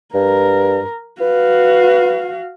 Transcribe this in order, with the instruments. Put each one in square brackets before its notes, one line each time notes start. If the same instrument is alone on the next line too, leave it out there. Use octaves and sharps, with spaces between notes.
[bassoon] G2 [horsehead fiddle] A#4
[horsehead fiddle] F#4 F5 [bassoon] B4